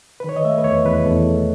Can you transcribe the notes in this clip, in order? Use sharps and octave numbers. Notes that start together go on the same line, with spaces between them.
B4
D#3 C#5
D#5
A3 E5
B4
E2 C#5
E2 B4
E2 A4
A3